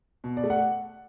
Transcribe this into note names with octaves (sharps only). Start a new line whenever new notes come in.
B2
D5
A3
F#5